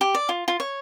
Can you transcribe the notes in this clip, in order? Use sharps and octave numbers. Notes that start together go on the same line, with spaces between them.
G4
D5
F4
F4
C#5